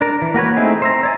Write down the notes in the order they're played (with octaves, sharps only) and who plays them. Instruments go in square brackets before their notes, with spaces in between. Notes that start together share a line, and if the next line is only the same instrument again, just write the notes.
[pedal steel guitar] D4 A#4
E3
A#3 F#4 B4 C#5
A3 C4 D#4 E4 G#4
C5 E5 A#5
C#5 D5 G#5